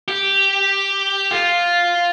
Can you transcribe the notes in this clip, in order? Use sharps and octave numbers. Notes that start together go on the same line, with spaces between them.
G4
F4